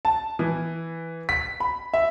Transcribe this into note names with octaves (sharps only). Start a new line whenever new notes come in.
A5
E3
B6
B5
E5